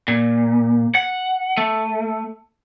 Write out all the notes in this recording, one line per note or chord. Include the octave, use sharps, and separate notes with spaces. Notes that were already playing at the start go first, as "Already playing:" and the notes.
A#2
F#5
A3